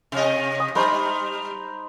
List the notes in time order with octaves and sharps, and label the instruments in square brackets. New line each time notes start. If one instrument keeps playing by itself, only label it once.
[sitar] C3 D#5
[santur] D#6
[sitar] G3 [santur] D#4 C5 B5